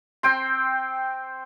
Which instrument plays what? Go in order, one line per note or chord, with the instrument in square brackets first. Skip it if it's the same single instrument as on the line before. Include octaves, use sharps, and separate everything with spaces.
[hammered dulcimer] C4 G5 C6